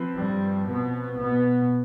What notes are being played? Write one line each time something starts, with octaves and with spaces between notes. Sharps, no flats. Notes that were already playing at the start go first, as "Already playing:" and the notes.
Already playing: F3 C4 B4
G2 G3
B2 B3
B2 B3